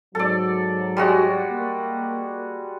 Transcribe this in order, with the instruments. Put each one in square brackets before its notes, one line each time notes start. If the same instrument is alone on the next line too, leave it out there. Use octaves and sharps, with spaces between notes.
[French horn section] G#2 F#3 [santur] A4 D5
[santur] G3 G#3 F#4
[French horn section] A#3